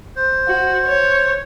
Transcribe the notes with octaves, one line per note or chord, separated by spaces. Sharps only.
C5
F#4
C#5